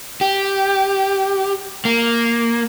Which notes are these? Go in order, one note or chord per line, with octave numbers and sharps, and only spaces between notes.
G4
A#3